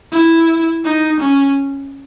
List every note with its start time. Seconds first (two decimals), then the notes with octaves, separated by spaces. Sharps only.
0.12 E4
0.85 D#4
1.20 C#4